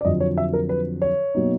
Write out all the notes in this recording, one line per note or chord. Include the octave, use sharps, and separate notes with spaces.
D5
F2 D3 F#3 D#5
C#5
E5
A#4
B4
C#5
B2 F#3 A#3 D#4